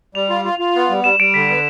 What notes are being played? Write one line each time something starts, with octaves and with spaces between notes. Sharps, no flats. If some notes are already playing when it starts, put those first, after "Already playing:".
G3 F7
F4
F4
F4
B3
G3
G3 E7
G3 D7
D3 B6
B3 D7